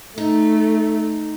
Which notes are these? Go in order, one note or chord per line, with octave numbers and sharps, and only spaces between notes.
A3 D#4